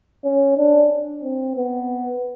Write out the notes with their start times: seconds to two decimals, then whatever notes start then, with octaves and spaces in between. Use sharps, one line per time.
0.25 C#4
0.58 D4
1.23 C4
1.56 B3